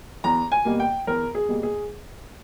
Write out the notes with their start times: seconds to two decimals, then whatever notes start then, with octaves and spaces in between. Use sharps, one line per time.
0.24 E2 A#5
0.52 G#5
0.65 B2 G3 A#3
0.80 G5
1.07 E2 A#4
1.35 G#4
1.48 B2 G3 A#3
1.63 G#4